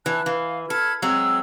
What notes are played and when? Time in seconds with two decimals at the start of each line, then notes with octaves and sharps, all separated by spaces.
0.06 E3 A5 F#6
0.26 E3 F5
0.70 A4 B5 F6 G#6
1.02 F#3 G#3 C4 E6